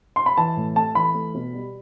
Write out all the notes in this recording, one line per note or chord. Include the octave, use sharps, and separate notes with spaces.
C6
B5
E3 A5
A2
A3 A5
E3 B5
A3
B2
G3